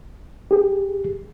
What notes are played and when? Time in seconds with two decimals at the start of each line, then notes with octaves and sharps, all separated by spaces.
0.51 G4 G#4